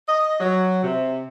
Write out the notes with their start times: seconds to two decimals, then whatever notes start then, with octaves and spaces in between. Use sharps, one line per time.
0.07 D#5
0.40 F#3
0.83 C3